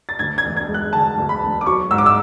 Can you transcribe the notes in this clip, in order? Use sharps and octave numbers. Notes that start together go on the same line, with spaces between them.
A6
D2 G#6
G#6
E1
G#6
G#3
F#6
D3 A5
D2
B5
E1
D6
F#3 C#6
G#2 E6
D6
E6